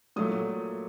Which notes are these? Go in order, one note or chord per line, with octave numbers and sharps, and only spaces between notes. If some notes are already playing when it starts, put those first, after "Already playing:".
A#2 F#3 A3 D#6